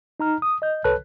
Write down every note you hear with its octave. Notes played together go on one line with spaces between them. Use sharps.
D#4 A#5 F6
D#6
D#5 G6
C2 A4 B4 C#5 A5 F#6